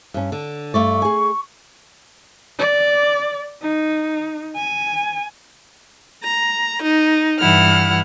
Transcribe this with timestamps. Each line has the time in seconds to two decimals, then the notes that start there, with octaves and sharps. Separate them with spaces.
0.14 G2 C#4
0.32 D3
0.74 G2 A3 D5 C#6
1.02 G#4 G#5
2.58 D5
3.62 D#4
4.55 G#5
6.24 A#5
6.82 D#4
7.40 G2 E3 E4 F#5 F6